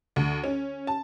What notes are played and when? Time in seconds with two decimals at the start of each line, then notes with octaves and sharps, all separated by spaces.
0.16 D2
0.44 C#4
0.87 A5